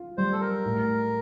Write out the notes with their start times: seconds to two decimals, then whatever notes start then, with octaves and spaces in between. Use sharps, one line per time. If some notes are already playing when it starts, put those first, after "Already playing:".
Already playing: F4
0.17 G3 C5
0.32 A4
0.41 A#4
0.65 A2